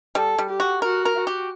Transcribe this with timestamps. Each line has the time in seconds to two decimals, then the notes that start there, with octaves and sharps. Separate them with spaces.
0.15 G3 A4
0.38 G3
0.49 G4
0.60 F#4
0.82 F#4 A#4
1.05 A#4
1.16 F#4
1.27 G4